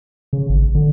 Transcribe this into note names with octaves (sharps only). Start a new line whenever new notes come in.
C#3
G#1
D3